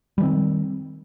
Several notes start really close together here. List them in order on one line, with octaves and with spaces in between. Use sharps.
G3 E3 C4 D#3